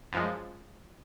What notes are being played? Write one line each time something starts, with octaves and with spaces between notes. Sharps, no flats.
F#2 F3 G#3